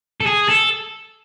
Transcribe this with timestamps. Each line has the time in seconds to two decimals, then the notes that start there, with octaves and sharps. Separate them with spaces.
0.20 A4
0.26 G#4
0.49 A4